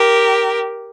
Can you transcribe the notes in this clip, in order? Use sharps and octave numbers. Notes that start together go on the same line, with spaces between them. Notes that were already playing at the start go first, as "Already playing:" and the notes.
Already playing: G4 A#4